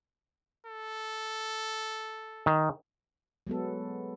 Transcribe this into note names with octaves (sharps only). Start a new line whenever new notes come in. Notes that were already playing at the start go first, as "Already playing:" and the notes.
A4
D#3
F#3 G#3 B3 A4